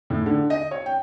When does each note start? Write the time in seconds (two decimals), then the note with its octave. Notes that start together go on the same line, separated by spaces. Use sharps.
0.10 A2
0.26 D3
0.50 D#5
0.71 C#5
0.86 G5